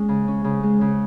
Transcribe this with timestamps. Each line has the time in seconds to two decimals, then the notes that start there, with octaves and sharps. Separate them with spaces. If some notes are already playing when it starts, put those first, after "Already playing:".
Already playing: G#3 C#4
0.09 C#3
0.28 C#4
0.44 C#3
0.63 G#3
0.81 C#3